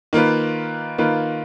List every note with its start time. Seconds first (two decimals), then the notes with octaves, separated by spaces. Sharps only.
0.13 D#3 A#3 F4 B4
0.98 D#3 A#3 F4 B4